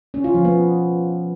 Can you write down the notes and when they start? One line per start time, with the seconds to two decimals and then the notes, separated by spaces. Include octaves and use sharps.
0.14 C#4
0.24 F4
0.34 F3
0.45 B3